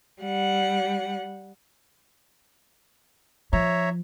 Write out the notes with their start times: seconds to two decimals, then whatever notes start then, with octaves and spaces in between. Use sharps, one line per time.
0.22 G3 F#5
3.53 F3 C#5 E5 A#5